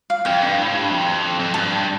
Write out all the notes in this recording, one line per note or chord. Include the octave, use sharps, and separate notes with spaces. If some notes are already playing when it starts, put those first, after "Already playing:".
F5
F2 G5
G2
A2
G2
F2
F2
G2 A5